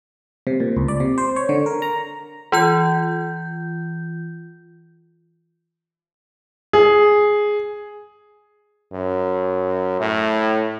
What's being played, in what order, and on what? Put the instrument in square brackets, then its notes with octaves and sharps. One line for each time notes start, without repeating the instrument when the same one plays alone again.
[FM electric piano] C3
A#2
C#2
D5
C3
C5
C#5
D3
A#4
A#5
[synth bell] E3 F4 G6
[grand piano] G#4
[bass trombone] F#2
A2